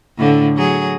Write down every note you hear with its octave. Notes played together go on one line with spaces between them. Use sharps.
A2 D3
F#3 G#4